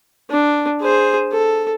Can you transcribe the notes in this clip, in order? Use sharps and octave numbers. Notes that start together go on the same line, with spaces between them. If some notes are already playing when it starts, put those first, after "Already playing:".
D4
G#4 C5
A4